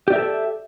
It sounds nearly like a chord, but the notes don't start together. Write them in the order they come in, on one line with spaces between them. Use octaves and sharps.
G4 D5 E5 A#4 A4